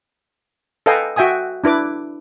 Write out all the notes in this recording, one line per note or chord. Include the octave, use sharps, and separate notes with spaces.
A4 B4 D#5 F5 G5 G#5
F#4 E5 G5 G#5 D#6
D4 E4 B4 D6